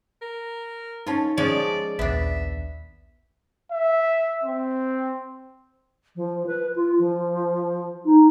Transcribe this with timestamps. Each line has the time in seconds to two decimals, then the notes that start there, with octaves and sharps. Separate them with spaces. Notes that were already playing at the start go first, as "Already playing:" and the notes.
0.22 A#4
1.07 C#4 D#4 F4 A5
1.38 F3 G#3 C#4 D5
1.99 A#1 D#2 B3 D4 E5
3.72 E5
4.44 C4
6.16 F3
6.47 B4
6.76 F4
6.99 F3
8.05 D#4